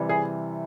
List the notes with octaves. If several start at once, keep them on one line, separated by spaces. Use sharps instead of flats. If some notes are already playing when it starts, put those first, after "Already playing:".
Already playing: C3 E3 G3
G#4